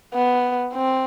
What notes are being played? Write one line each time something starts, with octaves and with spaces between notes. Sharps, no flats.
B3
C4